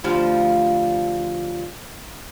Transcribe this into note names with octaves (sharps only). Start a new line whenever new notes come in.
D2 F3 G3